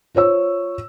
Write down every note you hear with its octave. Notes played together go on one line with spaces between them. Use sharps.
F4 C5 C#5 E6